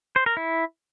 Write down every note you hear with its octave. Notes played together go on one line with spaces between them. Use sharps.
C5
A#4
E4